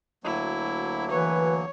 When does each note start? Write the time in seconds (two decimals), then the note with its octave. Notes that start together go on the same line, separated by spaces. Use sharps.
0.24 D2 F#3 A#3 E4
1.10 E3 B4 C#5